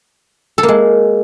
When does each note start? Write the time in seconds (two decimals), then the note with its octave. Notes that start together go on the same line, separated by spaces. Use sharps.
0.58 A4
0.63 A#3
0.68 G#3